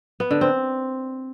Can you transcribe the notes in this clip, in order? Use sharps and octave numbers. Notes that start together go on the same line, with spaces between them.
B3
D3
C4